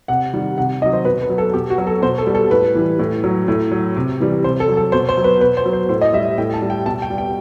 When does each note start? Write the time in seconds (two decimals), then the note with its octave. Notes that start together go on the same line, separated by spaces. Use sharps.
0.08 C3 F#5
0.33 D#3 G3
0.58 C3 F#5
0.81 D#3 D#5
0.86 F#3
0.93 C5
1.05 B2 B4
1.22 B4
1.29 F#3
1.38 A4
1.54 B2 G4
1.70 F#4
1.78 F#3
1.87 A4
2.02 B2 C5
2.18 A4
2.27 G3
2.35 A4
2.50 A2 B4
2.75 E3 G3
2.99 A2
3.24 F#3
3.48 A2
3.72 F#3
3.96 C3
4.20 E3 G3
4.44 C3 C5
4.60 A4
4.68 F#3
4.77 A4
4.92 B2 C5
5.09 C5
5.17 F#3
5.24 B4
5.41 B2 B4
5.57 C5
5.65 F#3
5.73 C5
5.89 A2 C5
6.01 D#5
6.13 G3 E5
6.38 A2 G5
6.54 A5
6.62 G3
6.70 G5
6.86 B2 A5
7.02 G5
7.10 G3
7.18 G5